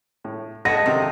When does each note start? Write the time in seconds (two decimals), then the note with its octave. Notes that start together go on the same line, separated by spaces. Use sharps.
0.24 A2
0.65 G#3 A3 F#4 D#5 F#5 A5 A#6
0.86 C3 D#3 F3 D#4